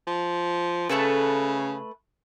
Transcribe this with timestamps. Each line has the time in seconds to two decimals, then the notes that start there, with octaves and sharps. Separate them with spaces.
0.07 F3
0.89 C#3 A3 A4 B4